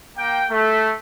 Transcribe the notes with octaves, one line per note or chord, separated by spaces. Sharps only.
A#3 G5
A3